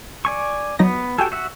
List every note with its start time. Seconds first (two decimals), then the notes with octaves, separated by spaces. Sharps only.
0.25 D5 G#5 C#6
0.79 F#3 B3 D#4 A#6
1.18 F#4 G4 A4 G5 G#5
1.32 F#4 E5 F#5